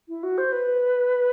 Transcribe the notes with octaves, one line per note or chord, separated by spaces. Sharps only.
E4
F#4
C5
B4